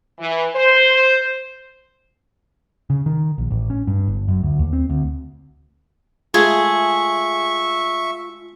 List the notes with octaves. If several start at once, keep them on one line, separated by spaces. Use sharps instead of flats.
E3
C5
C#3
D#3
A#1
A1
C#4
G2
G1
F#2
D2
D#2
C4
D2
G#3 A3 F4 G#4 E5 C#6